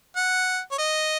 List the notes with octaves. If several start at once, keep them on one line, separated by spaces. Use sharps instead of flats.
F#5
C#5
D#5